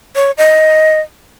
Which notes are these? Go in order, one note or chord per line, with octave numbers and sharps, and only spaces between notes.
C#5
D#5